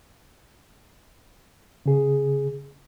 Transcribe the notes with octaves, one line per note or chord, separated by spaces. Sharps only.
C#3 G#4